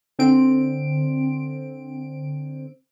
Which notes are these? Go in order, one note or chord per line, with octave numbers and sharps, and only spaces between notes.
D3 C4 D7